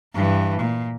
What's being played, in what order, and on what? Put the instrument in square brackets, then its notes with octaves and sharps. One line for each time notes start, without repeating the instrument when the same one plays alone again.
[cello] G2 E3
A#2